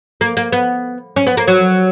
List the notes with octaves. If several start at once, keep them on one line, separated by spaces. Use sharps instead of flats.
A#3
A#3
B3
C#4
B3
A#3
F#3